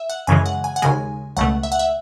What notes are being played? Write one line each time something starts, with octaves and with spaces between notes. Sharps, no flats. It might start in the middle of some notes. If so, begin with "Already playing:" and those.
Already playing: E5
F#5
F#2 C#3 E3 G#3 G#5
F#5
G#5
F#5
D#2 C#3 G#3 G#5
C#2 B2 A3 F#5
E5
F#5
E5